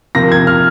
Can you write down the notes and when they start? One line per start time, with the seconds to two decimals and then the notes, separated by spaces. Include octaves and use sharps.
0.15 C3 F3 A#3 A#6
0.32 G#6
0.47 F6